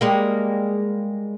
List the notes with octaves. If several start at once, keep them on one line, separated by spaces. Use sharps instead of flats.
G3 G#3 A#3